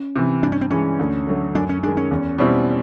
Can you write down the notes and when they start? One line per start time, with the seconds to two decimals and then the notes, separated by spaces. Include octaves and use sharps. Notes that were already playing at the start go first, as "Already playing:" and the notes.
Already playing: C#4
0.16 C3 E3
0.42 G2 D4
0.52 C#4
0.61 C4
0.70 E3 G#3 C#4
0.99 D2
1.27 D3 F#3 A3
1.55 F#2 D4
1.69 C#4
1.83 D#3 G#3 D4
1.97 C#4
2.11 E2
2.38 B2 G3 C4 E4